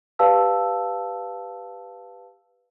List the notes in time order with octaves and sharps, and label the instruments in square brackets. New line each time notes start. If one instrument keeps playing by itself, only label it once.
[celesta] G4 B4 D5 F5 A5 E6